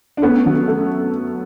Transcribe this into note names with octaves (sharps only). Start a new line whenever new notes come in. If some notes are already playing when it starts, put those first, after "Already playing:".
D4
A3 B3 C#4
F#3
A3